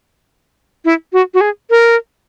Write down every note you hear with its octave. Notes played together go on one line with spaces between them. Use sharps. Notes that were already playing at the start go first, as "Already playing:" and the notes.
E4
F#4
F#4
G#4
A#4